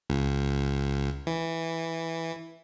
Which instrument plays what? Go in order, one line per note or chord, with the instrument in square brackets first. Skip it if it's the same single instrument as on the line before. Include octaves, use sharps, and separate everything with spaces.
[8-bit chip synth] C#2
E3